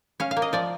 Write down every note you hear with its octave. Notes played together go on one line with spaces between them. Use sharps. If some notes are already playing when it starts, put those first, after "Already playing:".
C#4 F5
F5
A#3
D#5
F3 D5